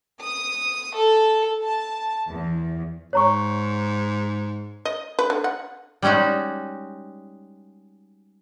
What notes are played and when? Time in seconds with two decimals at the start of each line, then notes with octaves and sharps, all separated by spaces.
0.21 D#6
0.95 A4
1.63 A5
2.30 E2
3.13 G#2 C#5 A#5 C#6
4.85 D#5
5.19 B4
5.30 D3
5.44 F#5
6.02 G3 G#3 C#4 D#4 F#4